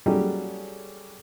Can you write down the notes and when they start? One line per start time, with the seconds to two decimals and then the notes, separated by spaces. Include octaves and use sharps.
0.06 F#3 G3 C#4 F#4 G#4 A4